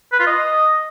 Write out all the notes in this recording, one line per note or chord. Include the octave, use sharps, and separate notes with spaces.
B4
F4
D#5